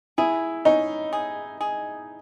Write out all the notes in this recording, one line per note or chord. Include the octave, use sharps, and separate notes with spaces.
E4 G#4
C#4 D#4
G#4
G#4